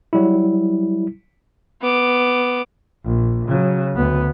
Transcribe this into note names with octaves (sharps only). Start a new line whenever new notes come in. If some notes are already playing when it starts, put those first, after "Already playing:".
F#3 G3 E4
B3 D6
A#1
C#3 F#3
D2 B3